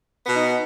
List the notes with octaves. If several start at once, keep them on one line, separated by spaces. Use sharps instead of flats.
B2 B3 D#4